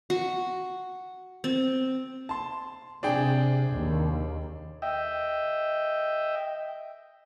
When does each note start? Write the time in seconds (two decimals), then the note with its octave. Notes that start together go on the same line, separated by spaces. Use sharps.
0.10 F#4
1.44 C4
2.29 A5 C6
3.03 C3 D4 G#4 G5
3.72 D#2
4.82 D#5 E5 G5